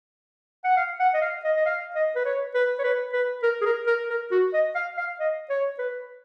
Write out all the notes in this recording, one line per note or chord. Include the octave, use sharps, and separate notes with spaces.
F#5
F5
F#5
D#5
F5
D#5
D#5
F5
D#5
B4
C#5
B4
C#5
B4
B4
A#4
G#4
A#4
A#4
A#4
F#4
D#5
F5
F5
D#5
C#5
B4